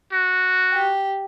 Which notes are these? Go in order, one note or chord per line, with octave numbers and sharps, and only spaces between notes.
F#4
G4